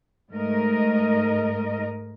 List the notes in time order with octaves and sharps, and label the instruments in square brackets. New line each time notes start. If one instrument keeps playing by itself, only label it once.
[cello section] G#2 A3 A#4 D#5